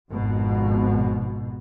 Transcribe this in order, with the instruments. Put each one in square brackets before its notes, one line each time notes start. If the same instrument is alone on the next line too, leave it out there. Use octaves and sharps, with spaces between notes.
[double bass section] G#1 F2 G#2 B2